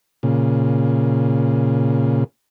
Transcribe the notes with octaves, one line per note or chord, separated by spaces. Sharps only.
A#2 C#3